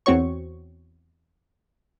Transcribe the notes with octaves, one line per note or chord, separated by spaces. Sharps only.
E2 C4 F#4 C#5 C#6